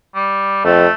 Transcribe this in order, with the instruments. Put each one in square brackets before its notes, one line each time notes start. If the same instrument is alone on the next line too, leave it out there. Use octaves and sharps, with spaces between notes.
[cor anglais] G3
[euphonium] F2 [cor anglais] A3